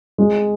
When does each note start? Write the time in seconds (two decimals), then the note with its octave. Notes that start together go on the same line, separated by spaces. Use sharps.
0.18 G#3